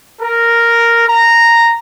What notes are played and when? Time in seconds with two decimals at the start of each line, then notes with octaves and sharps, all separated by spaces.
0.20 A#4
1.07 A#5